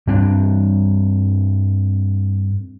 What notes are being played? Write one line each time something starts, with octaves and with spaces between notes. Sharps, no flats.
G2 G3 C4 D4